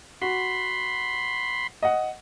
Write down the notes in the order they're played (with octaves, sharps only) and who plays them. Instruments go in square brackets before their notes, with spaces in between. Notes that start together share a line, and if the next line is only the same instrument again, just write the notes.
[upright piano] F#4 [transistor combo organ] B5 C6
[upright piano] D#5 F#5